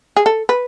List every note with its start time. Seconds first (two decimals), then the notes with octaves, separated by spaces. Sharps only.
0.16 G#4
0.26 A4
0.49 B4